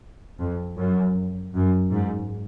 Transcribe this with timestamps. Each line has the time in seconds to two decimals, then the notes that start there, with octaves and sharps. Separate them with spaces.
0.39 F2
0.78 F#2
1.54 F#2
1.92 G#2